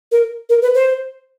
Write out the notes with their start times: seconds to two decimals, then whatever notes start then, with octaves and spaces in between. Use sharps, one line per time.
0.12 A#4
0.49 A#4
0.62 B4
0.75 C5